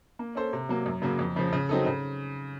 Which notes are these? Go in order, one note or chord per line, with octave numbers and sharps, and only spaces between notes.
A#3
C#4 A4 C5
C3
F#3 A#3
F#2
C#3 F#3 A#3
F2
C#3 F3
C#3
F#3 C4 D#4 A4
C#3